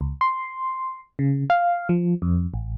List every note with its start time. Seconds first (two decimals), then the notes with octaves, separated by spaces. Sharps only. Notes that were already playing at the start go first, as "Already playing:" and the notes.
0.01 C#2
0.21 C6
1.19 C#3
1.50 F5
1.89 F3
2.22 F2
2.54 A1